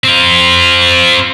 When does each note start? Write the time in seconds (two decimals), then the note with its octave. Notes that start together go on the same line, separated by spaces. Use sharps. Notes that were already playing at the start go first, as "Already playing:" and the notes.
0.04 C4 F4